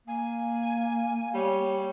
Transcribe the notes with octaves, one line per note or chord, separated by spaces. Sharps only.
A#3 G#5
G3 C#5